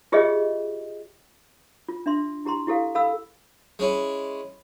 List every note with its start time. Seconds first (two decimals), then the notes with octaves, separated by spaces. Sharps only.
0.12 F4 G4 G#4 C#5 D#5 E5
1.89 F4
2.06 D4 E5 C6
2.45 E4 G4 A#5 C6
2.67 E4 G4 A4 F5
2.95 A4 F5 B5 E6
3.79 G#3 C#4 E4